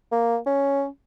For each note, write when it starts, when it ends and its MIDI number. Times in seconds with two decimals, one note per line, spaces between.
0.11 0.37 58
0.46 0.86 61